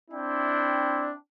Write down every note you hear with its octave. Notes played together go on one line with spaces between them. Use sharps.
C4 D4 E4 G5